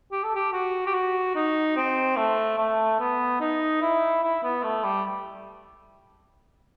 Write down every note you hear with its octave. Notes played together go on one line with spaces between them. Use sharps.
G4
A4
G4
F#4
G4
F#4
D#4
C4
A3
A3
B3
D#4
E4
E4
B3
A3
G3